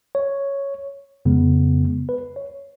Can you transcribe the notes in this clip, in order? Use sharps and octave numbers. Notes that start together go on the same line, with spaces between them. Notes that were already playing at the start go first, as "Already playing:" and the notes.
C#5
F2 C#3 G#3 B3
B4
C#5